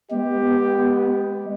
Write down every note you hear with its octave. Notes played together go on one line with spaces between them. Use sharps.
G#3 B3 G4